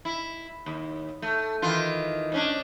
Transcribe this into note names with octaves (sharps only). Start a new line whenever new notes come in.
E4
D#2
A3
D#3 E3 F4
G#2 C#4 D4